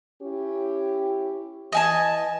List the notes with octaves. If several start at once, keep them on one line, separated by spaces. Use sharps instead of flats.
C#4 E4 G4
E3 D#5 G#5 A5